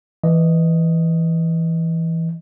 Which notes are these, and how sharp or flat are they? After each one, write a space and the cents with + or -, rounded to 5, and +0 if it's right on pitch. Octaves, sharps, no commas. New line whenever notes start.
E3 +0 D#5 +0